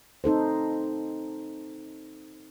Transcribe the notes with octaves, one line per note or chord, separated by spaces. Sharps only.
C4 D#4 A4 C5